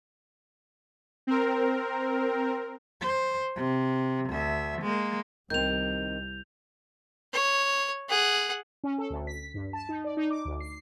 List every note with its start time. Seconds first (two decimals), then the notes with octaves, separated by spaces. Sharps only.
1.27 C4 A#4
3.01 C5
3.55 C3
4.29 D2 E5
4.82 G#3 A#3
5.50 C2 D#3 C4 G6 F7
7.33 C#5
8.09 G#4 F#5
8.84 C#4
8.98 A4
9.10 D2
9.27 B6
9.54 G2
9.73 A5
9.89 D#4
10.04 D5
10.17 D#4
10.31 D6
10.45 D2
10.60 C7